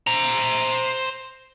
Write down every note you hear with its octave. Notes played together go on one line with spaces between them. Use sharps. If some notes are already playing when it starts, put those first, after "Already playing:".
C5 A#5